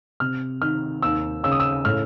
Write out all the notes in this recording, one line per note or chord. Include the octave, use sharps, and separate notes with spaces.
C3 F6
D#3 F6
D#2 E6
C#3 E6
D#6
E6
A2 F6